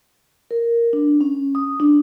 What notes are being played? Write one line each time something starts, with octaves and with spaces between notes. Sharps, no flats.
A#4
D4
C#4
D#6
D4